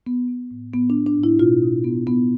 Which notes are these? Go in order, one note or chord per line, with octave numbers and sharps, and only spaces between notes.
B3
B3
A2
A2 B3
D4
B3
D4
A2
E4
B2 F4
B2
B3
B3